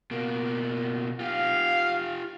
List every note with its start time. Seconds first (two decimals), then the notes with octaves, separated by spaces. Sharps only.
0.11 B2 A#3
1.20 F4 G4 F5